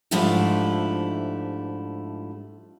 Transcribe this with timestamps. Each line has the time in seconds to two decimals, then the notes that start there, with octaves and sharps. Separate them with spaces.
0.11 G#2 F3 A3 D4 E4 G4